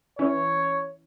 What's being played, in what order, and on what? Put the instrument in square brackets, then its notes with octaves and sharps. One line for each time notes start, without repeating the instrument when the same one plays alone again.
[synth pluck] E3 C#4 E4 [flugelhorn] C#5